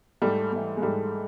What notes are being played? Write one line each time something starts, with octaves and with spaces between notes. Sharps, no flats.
G#2 G3 A3
E3 G3
G#3
G#2 G3 A3